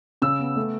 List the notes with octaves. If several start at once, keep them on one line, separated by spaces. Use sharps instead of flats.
C#3 E6
B3
A3